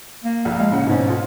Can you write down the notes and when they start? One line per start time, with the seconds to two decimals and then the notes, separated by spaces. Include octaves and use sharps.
0.24 A#3
0.45 A#1
0.60 G#3 F5
0.72 A2 C#3 F#5
0.87 G#2 B2 C#4
1.10 F4